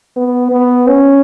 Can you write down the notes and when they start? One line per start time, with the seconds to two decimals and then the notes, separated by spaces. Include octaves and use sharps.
0.17 B3
0.52 B3
0.87 C#4